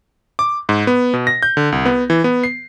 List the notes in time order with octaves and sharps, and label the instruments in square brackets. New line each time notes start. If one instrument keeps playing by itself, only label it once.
[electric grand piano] D6
G#2
B3
B2
A#6
G6
D3
C2
B3
E3
B3
C7